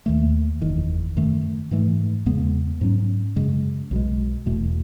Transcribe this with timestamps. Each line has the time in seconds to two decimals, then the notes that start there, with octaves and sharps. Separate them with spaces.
0.06 D#2 D#3 A3
0.61 F#1 E2 D#3
1.16 F#2 D#3 A3
1.71 G#2 E3 A3
2.26 E2 C#3 G#3 B3
2.81 G#2 F#3 C#4
3.36 F#2 C#3 G#3
3.91 B1 B2 G#3
4.46 E1 E2 B2 A3